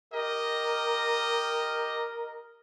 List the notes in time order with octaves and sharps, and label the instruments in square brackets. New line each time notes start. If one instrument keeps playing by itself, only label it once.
[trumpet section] G4 D#5 [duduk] A#4